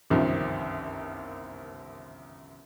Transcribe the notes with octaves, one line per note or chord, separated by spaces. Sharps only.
G1 C2 F#2 D#3 F3